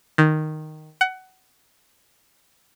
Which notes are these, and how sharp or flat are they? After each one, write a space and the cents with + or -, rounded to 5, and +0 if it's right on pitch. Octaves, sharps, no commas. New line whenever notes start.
D#3 -5
F#5 +20